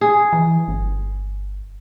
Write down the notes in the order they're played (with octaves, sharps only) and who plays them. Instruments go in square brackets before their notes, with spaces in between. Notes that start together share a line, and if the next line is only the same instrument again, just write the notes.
[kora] G#4
[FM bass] E3
G1